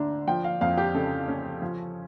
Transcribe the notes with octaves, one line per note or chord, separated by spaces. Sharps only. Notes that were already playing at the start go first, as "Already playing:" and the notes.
Already playing: D2 D3 D4 A#5
F3 G5
F5
F2 F5
G4
C#3 A4
C#4
F3